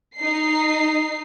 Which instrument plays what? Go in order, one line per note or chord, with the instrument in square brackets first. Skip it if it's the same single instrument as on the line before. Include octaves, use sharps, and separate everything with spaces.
[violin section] D#4 C7